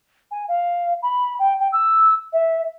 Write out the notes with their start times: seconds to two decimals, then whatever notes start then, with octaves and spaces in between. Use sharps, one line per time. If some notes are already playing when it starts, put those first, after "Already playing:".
0.31 G#5
0.48 F5
1.03 B5
1.39 G5
1.59 G5
1.72 E6
2.33 E5